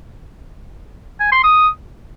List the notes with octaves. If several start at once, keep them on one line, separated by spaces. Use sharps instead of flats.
G#5
C6
D#6